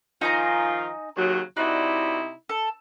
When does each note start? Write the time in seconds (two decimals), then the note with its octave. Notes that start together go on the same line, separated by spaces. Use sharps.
0.21 D#3 F3 D#4 F4 G#5 A#5
1.16 D#2 C#3 F#3
1.57 C3 D#4 E4 F#4 D5
2.49 A4